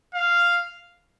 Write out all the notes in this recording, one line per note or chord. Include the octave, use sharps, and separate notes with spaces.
F5